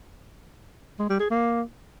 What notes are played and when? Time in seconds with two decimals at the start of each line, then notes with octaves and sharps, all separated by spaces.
0.99 G#3
1.09 G3
1.20 G#4
1.30 A#3